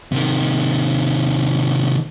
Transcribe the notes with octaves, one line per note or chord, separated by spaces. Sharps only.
C3 D#3